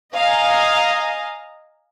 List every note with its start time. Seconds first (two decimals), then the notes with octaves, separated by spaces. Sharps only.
0.16 D#5 F5 G#5 A#5